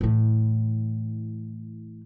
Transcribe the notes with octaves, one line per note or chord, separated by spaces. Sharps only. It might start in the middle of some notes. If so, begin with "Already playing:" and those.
A2 E3